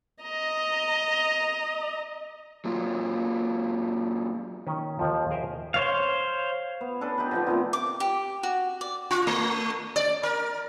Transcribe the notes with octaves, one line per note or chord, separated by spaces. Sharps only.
D#5 A#5
F#3 A#3 F4
D#3 C#4
D#2 F3
G#4 A#4 C5 D#5 E5
C5 C#5 F5
B3
C#4 D4 A4 B4
D#4 G4 B4
D3 F3 B3
C3 D#3 A3 B3
D6
G4
F#4
D5
F4
A3
D5
A#4